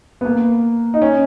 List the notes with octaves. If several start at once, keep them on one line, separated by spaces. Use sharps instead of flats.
B3
A#3
D#4
C#4